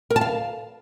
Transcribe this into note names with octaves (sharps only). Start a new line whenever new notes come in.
A#4
A5
F5